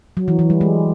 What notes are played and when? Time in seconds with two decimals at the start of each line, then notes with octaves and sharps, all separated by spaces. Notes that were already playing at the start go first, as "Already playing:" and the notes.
0.17 F#3
0.28 E3
0.39 E3
0.50 G3
0.61 G#3